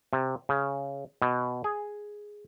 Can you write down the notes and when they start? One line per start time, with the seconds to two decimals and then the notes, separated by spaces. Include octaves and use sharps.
0.13 C3
0.49 C#3
1.22 B2
1.64 G#4